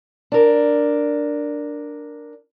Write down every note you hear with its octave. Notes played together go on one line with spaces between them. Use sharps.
D4 A#4